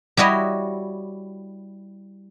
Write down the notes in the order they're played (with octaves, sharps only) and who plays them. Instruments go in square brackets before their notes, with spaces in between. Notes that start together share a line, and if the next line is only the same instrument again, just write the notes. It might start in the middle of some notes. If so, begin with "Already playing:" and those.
[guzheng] G3 E4 F#4 C#5 D#5